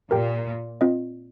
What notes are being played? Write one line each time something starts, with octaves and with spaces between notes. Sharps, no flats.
A#2 G4 A#4 G5
C4 F4 D#5